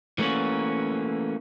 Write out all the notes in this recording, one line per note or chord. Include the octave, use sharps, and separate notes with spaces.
E3 A3 A#3 C#4 F#4